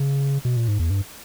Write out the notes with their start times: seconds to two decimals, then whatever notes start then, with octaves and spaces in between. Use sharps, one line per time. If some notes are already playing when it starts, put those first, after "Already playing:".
Already playing: C#3
0.45 B2
0.57 A#2
0.68 G#2
0.79 E2
0.90 G2